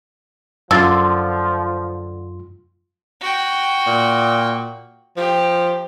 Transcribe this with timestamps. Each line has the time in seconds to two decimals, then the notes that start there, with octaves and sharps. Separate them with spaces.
0.71 F#2 D3 F3 F4 C6 E6 A6
3.21 F#4 G5
3.87 A#2
5.17 F3 G4